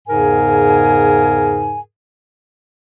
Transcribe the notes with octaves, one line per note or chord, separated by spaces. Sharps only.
E2 G#2 C#3 G#4 A#4 G#5